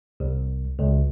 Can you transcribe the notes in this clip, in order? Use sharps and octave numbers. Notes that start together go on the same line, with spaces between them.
C2
C#2